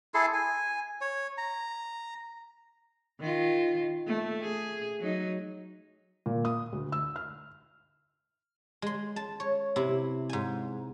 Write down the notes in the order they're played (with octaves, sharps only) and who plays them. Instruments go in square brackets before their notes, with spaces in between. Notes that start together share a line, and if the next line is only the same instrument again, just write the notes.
[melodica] E4 G#4 A4 C6
G#5
C#5
A#5
[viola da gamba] D#3 F4
A3
G#4
F#3 D#4
[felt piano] A#2
D#6
D2
E6
F6
[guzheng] G#3 C6
A5
C#5
C3 E4
G#2 G#5